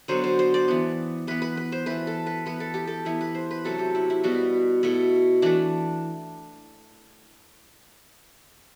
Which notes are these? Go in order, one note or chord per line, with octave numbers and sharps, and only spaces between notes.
D3 F#3 B3 C5
C5
C5
D5
E3 B3
E3 B3 B4
B4
B4
C5
E3 A3 B4
A4
B4
E3 B3 B4
A4
G4
A4
E3 B3 E4
B4
C5
B4
C3 F#3 A3 A4
G4
E4
E4
B2 G3 B3 F#4
B2 A3 E4
E3 A3 D4